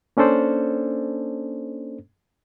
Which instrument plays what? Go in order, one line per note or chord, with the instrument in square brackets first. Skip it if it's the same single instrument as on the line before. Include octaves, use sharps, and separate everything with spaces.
[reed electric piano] A#3 C#4 D4 A4 C5 D5